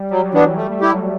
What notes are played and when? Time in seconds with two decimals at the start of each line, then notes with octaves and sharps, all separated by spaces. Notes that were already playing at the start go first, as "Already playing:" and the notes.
Already playing: G3
0.10 F#3 G3
0.22 F#3
0.32 E3 B3 D4
0.44 F#3
0.57 G3 A3
0.69 A3
0.81 G3 E4 G4
0.92 F#3